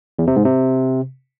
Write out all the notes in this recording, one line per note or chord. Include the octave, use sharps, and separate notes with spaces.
E2
C3
G#2
C3